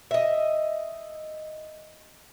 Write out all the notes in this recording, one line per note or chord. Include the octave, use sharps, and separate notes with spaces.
D#5 E5